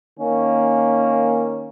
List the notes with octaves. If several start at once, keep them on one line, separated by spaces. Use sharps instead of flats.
D#3 A#3 C#4